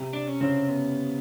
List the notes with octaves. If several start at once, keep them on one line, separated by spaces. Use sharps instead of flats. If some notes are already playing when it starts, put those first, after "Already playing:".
Already playing: C3
D4
C#4
C#3 C4
B3